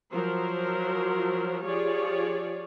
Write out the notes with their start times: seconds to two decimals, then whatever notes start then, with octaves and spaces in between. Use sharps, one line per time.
0.11 F3 F#3 A#4 C5
1.65 F3 F4 G4 G#4 C#5 D5